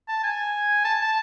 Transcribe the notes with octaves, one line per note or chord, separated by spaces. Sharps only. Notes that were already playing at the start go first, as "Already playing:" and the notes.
A5
G#5
A5
A5